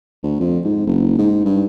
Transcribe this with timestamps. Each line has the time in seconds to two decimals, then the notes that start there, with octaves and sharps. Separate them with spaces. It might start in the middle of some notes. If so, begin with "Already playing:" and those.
0.23 D2
0.40 F2
0.65 G#2
0.87 F#1
1.18 G#2
1.45 G2